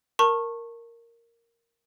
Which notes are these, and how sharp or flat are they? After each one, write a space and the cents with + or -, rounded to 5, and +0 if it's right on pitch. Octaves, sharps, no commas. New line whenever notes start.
A#4 -5 A5 +25 C#6 -20